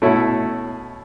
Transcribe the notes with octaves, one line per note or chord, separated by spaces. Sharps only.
B2 A3 C#4 E4